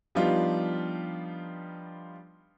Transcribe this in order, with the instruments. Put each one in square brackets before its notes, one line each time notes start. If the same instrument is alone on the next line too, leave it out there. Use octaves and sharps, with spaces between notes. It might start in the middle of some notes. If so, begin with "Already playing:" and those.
[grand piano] F3 G3 B3 D4 D#4 F4